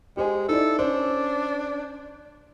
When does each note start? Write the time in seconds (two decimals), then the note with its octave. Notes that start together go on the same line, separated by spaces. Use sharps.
0.17 G#3 G4 C5 G#5
0.49 D#4 E4 A4 D5
0.79 C#4 D4 C5